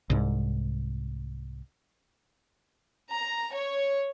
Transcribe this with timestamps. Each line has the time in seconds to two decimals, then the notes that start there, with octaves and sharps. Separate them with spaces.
0.10 C2 G#2
3.11 A#5
3.52 C#5